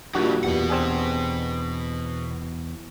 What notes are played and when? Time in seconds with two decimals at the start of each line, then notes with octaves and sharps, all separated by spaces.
0.15 A#2 D#3 G3 D4 E4 F#4
0.44 E2 B2 B3 G4 F#5
0.70 C4 D4 G#4